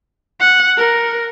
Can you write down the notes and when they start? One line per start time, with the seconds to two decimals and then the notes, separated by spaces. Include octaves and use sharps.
0.40 F#5
0.77 A#4